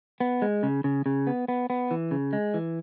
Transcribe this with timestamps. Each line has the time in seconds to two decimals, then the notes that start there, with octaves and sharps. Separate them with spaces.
0.20 B3
0.42 G#3
0.63 C#3
0.84 C#3
1.06 C#3
1.27 B3
1.48 B3
1.70 B3
1.91 E3
2.11 C#3
2.33 G#3
2.54 E3